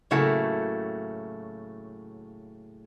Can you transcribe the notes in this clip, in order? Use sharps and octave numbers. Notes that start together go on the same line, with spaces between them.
A2 C#3 F#3 A3 A#3 F#5